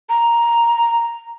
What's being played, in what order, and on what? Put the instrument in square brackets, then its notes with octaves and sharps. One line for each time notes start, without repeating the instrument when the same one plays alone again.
[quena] A#5